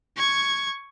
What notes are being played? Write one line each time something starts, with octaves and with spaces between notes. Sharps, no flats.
C#6 G#6